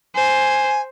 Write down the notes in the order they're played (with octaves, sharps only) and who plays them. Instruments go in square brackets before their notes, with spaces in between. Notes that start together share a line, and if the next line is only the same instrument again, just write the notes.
[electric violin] C5 [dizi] G#5